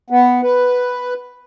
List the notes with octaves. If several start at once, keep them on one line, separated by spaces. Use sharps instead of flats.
B3
B4